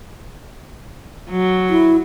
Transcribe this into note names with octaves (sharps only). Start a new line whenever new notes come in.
F#3
E4